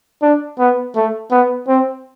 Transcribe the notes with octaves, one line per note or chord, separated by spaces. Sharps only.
D4
B3
A3
B3
C4